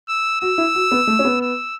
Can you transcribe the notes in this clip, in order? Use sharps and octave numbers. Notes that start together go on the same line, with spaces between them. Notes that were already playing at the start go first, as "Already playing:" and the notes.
E6
F#4 E6
E4
F#4
B3
A3
C#4
B3
E6